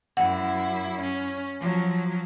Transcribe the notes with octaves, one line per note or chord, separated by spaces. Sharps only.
F#2 E4 F#5
C#4
F3 F#3